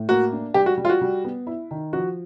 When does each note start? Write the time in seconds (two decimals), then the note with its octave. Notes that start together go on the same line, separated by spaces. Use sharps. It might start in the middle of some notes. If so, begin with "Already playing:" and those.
Already playing: A2
0.09 A#3 F#4
0.32 D4
0.54 G3 G4
0.66 F#4
0.77 G3
0.85 F4
0.89 F#4
1.01 G3
1.24 B3
1.47 E4
1.71 D#3
1.93 F3 F#4